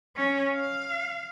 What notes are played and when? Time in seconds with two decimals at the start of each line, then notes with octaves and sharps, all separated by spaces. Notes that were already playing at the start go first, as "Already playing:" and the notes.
0.16 C#4
0.53 F5